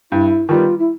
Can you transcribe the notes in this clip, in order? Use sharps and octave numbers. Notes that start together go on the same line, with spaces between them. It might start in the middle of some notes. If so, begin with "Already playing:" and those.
G2 E4
D#3 G3 B3 F4
E4